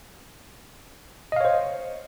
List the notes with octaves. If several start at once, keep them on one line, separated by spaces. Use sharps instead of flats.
C5 C#5 D#5 F5